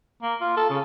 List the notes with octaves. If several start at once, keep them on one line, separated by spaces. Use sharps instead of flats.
A#3
F4
A4
C#3